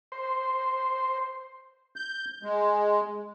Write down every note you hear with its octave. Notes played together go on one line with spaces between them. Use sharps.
C5
G6
G#3